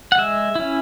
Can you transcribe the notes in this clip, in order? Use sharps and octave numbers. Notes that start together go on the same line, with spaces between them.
F#5
G#3 E5
C#4 E4